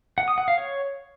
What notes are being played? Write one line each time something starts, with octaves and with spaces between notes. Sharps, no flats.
F#5
D#6
F#5
F5
C#5